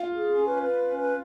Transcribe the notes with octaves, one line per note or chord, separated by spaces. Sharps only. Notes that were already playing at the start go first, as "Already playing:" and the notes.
Already playing: F4
G#4
C#4
B4
B4
C#4
B4